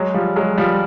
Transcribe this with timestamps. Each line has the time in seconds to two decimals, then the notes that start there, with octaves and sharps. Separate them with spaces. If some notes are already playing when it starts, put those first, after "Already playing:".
Already playing: F#3 G#3
0.14 F3 G3
0.36 F#3 G#3
0.58 F3 G3